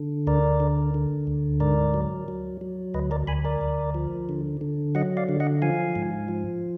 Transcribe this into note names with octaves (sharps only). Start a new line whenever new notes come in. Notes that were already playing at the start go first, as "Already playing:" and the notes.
Already playing: D3
D2 A#4 D5
D3
D3
D2
G#2 A#4 D5
F#3
F#3
F#3
D2 B4 D#5
A#4 D5
D2 G#5 B5
A#4 D5
D2
F3
D3
D3
F#3 D#5 F#5
D5 F5
D3
D#5 F#5
F3 F5 G#5
G#2
F3